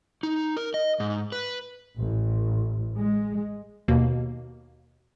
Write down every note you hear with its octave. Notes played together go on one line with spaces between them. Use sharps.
D#4
A#4
D#5
G#2
B4
A1
G#3
D#2 B2 A#3